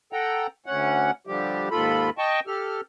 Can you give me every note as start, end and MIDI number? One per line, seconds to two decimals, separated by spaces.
0.13 0.47 69
0.13 0.47 78
0.13 0.47 79
0.13 0.47 82
0.66 1.11 38
0.66 1.11 61
0.66 1.11 78
1.27 1.69 50
1.27 1.69 53
1.27 1.69 55
1.27 1.69 67
1.71 2.10 39
1.71 2.10 44
1.71 2.10 65
1.71 2.10 69
1.71 2.10 83
2.18 2.40 75
2.18 2.40 79
2.18 2.40 81
2.18 2.40 85
2.47 2.81 67
2.47 2.81 69
2.47 2.81 89